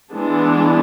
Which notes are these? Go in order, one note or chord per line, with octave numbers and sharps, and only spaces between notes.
E3 G#3 B3 D4